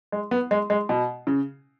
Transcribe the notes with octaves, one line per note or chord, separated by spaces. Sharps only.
G#3
B3
G#3
G#3
B2
C#3